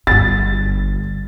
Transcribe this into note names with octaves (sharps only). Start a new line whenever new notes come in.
G1 G2 D3 A6